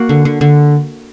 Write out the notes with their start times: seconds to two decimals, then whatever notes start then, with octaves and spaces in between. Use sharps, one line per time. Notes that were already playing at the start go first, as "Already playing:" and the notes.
Already playing: A#3 F#4 F#5
0.09 D3
0.25 D3
0.41 D3